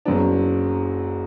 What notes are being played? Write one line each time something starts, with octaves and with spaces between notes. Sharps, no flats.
F#1 F#2 F#3 B3 D4